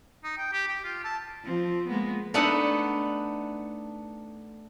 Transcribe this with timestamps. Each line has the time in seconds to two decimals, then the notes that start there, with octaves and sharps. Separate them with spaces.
0.24 D#4
0.38 G5
0.53 G4
0.68 G4
0.84 F4
1.04 A5
1.44 F3 C4
1.88 G#3 A#3 B3
2.34 A3 B3 D4 D#4 A4 F#5